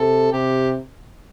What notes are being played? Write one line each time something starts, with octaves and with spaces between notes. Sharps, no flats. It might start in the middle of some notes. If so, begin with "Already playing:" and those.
Already playing: C3 A4
C3 G4